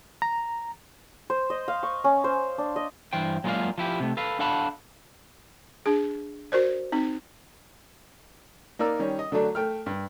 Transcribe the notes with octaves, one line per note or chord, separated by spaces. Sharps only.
A#5
C5
D#5
F5
C#6
C#4
C5
D4
D#5
G2 E3 C5 G5
F#3 G#3 A#3 F4 D5 F5
F3 E4 G4
C3 A3
A4 B4 F5
D4 A4 F5 F#5 A5 B5
D4 G#4
F#4 A#4 C5 D5
C4 D#4
A#3 D#4 A#4 D5 E6
D#3 G3 C#4
D#5
D3 F#3 A3 D4
A3 G5 F6
G2